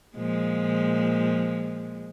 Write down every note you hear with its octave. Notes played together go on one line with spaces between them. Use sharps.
A#2 F3 G#3